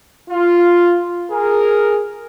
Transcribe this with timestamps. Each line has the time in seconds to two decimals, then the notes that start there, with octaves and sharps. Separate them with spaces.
0.30 F4
1.32 G#4 A#4